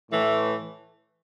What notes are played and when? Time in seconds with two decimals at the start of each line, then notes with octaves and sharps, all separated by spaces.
0.11 A2 E3 A3